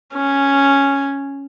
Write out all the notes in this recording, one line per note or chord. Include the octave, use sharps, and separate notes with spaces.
C#4